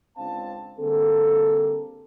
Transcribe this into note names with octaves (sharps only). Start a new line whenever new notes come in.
C#2 C4 D4 F5 A5
D3 G3 A#3 C4 G#4 A4